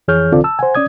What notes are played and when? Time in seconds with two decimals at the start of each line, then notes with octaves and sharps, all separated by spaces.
0.08 F2 E3 G#4 C#5 F6 G6
0.32 C2 D3 C4 F4 A4 D5
0.44 A5 E6
0.59 C5 F#5 G#5
0.75 C#4 D5 D#6 G#6